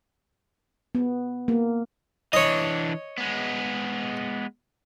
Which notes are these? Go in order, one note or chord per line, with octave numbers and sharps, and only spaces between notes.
B3
A#3
E3 D4 C#5 D#5
G#3 B3